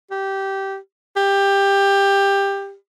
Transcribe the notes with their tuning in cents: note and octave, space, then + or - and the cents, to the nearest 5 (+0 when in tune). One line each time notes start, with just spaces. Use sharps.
G4 -15
G4 +15